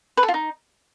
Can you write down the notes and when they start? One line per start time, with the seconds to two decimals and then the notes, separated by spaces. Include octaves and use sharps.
0.17 B4
0.23 A4
0.28 F4
0.34 D#4